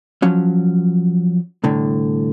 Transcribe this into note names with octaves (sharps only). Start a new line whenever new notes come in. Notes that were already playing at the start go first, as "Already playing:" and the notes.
F3 F#3 C#4
C2 A2 D3